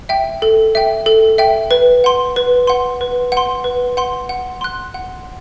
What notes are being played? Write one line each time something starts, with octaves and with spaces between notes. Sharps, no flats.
E5 G5
A4
E5 G5
A4
E5 G5
B4
F#5 C6
B4
F#5 C6
B4
F#5 C6
B4
F#5 C6
F#5
C6 F#6
F#5